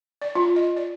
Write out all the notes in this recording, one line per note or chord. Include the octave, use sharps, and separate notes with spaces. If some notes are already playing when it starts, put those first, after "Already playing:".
D5
F4
D#5
D5